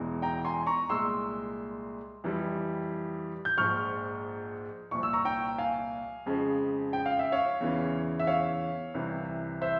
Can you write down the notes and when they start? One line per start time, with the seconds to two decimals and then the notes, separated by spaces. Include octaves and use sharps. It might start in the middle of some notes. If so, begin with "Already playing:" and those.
Already playing: E1 E2 E3 G#3
0.22 G5 A#5
0.45 G#5 C6
0.67 A#5 C#6
0.89 C2 A#2 G#3 C6 E6
2.24 F2 E3 G3
3.45 G6
3.57 A#1 G#2 F3 G#3 C#6 F6
4.91 C2 A#2 F3 C#6
5.03 E6
5.13 A#5 C#6
5.25 G5 A#5
5.58 F5 G#5
6.26 F2 C#3 F3 G#3
6.93 G5
7.06 F5
7.19 E5
7.32 C#5 F5
7.60 E2 C#3 E3
8.20 E5
8.27 C#5 F5
8.94 C2 C3 E3
9.62 C5 E5